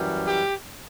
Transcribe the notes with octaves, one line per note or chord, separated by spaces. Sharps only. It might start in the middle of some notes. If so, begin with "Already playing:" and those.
Already playing: F#2 E3 G3
G4